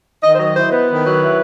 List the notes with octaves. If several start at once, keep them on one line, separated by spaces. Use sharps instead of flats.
D#3 D#5
C5
F#3 D#5
E4 C5
B3 B4
D#3
F#3
E4